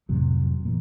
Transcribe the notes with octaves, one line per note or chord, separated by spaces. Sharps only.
F2 A2 C3 F#3
A#2 E3